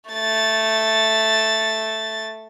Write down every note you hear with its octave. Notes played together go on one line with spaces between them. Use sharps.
A3 A6